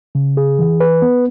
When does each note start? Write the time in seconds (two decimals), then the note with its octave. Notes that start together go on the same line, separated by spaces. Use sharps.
0.15 C#3
0.37 G#4
0.59 E3
0.80 B4
1.02 B3